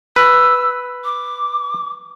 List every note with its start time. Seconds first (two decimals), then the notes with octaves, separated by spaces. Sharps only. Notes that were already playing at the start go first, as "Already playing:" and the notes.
0.16 B4 E6
1.05 D6